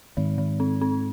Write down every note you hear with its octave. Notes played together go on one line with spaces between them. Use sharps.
G#2 D#3
D#3
C4
C4